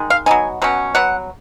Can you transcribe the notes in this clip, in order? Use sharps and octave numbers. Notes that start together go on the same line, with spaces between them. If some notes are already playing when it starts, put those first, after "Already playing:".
Already playing: D#3 G#3
F5
F#3 B3 D#4 G#5
B2 F#3 C#4
F#3 B3 F#5